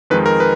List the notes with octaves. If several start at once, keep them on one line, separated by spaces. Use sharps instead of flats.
F2 D#3 G#3 D#4 B4
A#4
B4